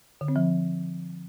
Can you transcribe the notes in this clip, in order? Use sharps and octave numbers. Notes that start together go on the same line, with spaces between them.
D3
C4
F3